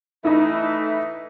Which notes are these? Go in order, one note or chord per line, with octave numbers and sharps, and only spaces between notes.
E3 A3 D#4 E4